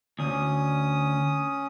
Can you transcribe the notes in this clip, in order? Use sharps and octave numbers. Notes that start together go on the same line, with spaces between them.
D2 C#4 D#6